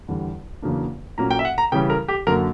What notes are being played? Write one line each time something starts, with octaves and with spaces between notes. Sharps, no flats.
E2 D3 G3
E2 C#3 F#3 A#3 D4
A#2 F#3 A#3 C#4 A#5
G5
E5
F#5
A#5
C#3 E3 G3 C#4 G5
A#4
G4
F#2 D3 A#3 A#4